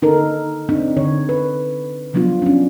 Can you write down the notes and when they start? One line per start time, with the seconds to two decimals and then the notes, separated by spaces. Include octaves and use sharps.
0.02 D3 D#4 A4 A#4
0.69 C4 D4 D#4
0.97 D3 C#5
1.29 B4
2.13 C#3 F3 F#3 B3 D4 F4
2.42 C#4 D4